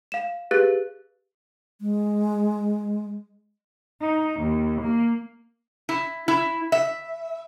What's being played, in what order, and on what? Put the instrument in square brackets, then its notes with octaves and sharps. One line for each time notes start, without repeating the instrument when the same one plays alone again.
[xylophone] F5 E7
G4 G#4 B4 F5 F#6 A6
[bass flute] G#3
[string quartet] D#4
D#2
A#3
[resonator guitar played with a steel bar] E4
E4
E5